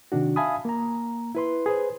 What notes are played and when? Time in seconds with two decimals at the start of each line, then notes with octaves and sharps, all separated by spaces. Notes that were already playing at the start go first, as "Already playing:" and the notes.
0.12 C3 D#3 D4 F#4
0.36 E5 F5 G#5 A5 B5 D#6
0.65 A#3 A#5
1.35 E4 B4 C6
1.66 G#4 B4 C5